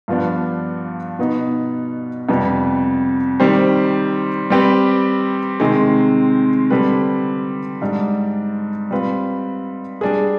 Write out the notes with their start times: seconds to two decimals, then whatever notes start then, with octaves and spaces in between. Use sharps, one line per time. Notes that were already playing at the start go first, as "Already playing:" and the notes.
0.08 G2 F3 B3 D4
1.19 B2 B3 D#4
2.29 F2 C3 G3 B3
3.40 D#3 G3 C4 G4 C5
4.50 G3 C4 G4 B4
5.60 C3 D#3 G#3 C4
6.70 D3 G3 C4 G4 B4
7.82 G#2 G3 D4
8.91 G3 C4 F4 B4
10.01 G3 D4 G#4